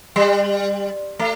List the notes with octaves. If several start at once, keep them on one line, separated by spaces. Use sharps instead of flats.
G3
A3